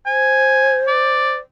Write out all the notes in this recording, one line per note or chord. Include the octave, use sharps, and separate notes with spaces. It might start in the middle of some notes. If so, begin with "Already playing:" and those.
C5 G#5
D5